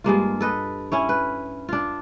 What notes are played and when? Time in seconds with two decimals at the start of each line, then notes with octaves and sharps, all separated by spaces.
0.04 G2 G#3 A#3 F4
0.41 A4 B4 D#5
0.92 C#4 E4 C#5
1.09 B4
1.69 D4 F4